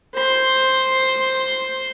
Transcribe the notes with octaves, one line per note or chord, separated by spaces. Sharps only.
C5 C6